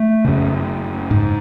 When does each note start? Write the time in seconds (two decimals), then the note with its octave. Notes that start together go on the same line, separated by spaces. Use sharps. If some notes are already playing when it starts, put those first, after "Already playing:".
Already playing: A3
0.25 F#2 C#3
1.11 G#2